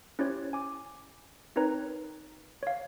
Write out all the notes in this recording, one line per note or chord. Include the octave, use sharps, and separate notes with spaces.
C#4 E4 G4 C5 C#5
G#5 D6
C4 D#4 A#4 B4 C#5 A#5
C#5 F5